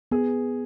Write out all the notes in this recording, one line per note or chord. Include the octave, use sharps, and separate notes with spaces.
B3 G#4